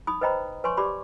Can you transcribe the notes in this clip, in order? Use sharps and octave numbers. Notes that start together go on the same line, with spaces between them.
D#4 B5 D#6
B4 C5 D#5 G5 A#5 B5
B4 C#5 G#5 C6 C#6
G4 D5 B5 D6